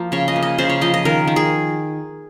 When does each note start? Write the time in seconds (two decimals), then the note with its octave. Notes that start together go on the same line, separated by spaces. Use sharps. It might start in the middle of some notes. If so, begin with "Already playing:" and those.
Already playing: F3 A#3
0.12 C#3 C#5
0.28 D#5
0.36 A#3
0.43 D#5
0.58 C#3 C5
0.70 C#5
0.81 F3 D#5
0.94 D#5
1.05 D#3 A#4
1.27 D#3
1.36 G#4